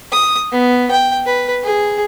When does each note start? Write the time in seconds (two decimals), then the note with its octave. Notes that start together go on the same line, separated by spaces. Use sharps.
0.13 D#6
0.52 B3
0.91 G5
1.26 B4
1.64 G#4